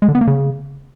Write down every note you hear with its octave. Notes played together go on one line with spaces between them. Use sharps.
G#3
D3
B3
A#3
C#3